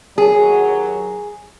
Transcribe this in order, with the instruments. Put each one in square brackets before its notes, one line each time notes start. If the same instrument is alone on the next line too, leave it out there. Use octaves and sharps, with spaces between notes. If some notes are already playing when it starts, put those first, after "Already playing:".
[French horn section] D#2 F#3 [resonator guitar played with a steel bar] G#4